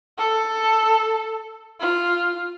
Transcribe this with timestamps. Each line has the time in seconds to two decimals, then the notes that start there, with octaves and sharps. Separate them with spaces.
0.18 A4
1.80 F4